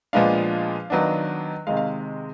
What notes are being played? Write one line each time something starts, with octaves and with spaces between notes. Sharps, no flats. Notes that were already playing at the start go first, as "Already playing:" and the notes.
A#2 F3 G#3 B3 D4 F5
D#3 F#3 B3 D4
C3 D#3 G#3 F5
F5